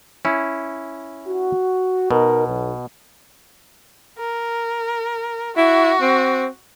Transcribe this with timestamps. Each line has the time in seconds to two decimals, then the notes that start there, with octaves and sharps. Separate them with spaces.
0.25 C#4 E4
1.27 F#4
2.11 B2 D#4 A#4
2.47 B1
4.19 A#4
5.57 E4 F#4
6.01 C4